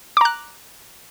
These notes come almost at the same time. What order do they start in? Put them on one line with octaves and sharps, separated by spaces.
D6 A#5 F#6